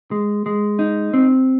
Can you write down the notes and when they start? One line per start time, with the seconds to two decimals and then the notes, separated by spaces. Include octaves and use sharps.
0.11 G#3
0.46 G#3
0.79 D#4
1.13 C4